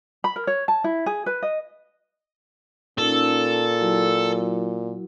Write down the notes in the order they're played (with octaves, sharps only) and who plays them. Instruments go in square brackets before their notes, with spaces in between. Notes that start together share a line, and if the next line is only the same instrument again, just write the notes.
[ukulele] B5
A#4
C#5
A5
E4
G#4
B4
D#5
[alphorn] A#2 [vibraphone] C#4 D#4 [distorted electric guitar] A4
[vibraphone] F#3 E4 F#4